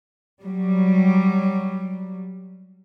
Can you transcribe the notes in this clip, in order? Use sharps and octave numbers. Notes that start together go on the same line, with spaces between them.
F#3 G3